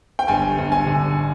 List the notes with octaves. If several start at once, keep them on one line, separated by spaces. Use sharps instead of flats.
G5
G1 G#5
G1
G#5
D3